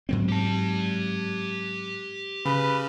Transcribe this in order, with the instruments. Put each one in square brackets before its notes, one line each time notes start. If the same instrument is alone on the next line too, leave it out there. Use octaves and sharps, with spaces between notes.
[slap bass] G#2 F#3 C4
[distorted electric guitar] G4 A5
[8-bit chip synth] C#3 [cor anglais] B4